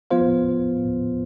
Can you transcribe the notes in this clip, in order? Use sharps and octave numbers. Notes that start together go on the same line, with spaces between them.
F3 B3 F4 C5 F5